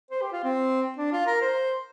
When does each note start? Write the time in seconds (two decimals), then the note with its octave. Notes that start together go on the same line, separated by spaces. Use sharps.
0.11 C5
0.21 G4
0.32 F4
0.43 C4
0.98 D4
1.13 F4
1.26 A#4
1.41 C5